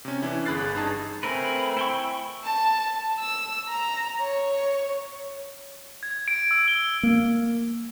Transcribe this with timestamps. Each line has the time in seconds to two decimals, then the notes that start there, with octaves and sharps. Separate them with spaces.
0.05 C3 C#4
0.22 E3 C#4 D4 E4
0.45 G1 G#4 B5 F#6 A6 C7
0.75 G2 D#4 G#4 A5
1.23 A3 C4 A#4 B4 G#5 B5
1.77 E4 G5 C#6
2.44 A5
3.20 E6
3.69 A#5
4.21 C#5
6.03 G#6
6.28 D7
6.51 E6
6.68 G7
7.03 A#3